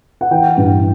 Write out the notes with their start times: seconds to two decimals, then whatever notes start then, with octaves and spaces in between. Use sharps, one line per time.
0.21 F#5
0.31 E3 G5
0.57 G2